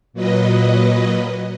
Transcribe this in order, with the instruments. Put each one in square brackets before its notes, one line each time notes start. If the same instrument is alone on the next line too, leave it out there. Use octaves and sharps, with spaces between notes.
[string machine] A#2 F#3 B4 D#5